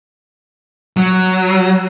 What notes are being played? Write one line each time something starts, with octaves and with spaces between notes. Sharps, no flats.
F#3